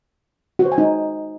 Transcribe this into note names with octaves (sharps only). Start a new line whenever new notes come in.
F#4
C5
G#5
D#4